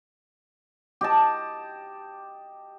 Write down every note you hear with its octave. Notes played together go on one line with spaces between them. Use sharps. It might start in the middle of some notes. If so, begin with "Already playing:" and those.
G4 D#5 A5